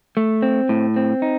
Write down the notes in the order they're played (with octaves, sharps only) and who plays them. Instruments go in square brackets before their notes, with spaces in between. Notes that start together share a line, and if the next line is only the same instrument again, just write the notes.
[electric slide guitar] A3
C4
A2
C4
D#4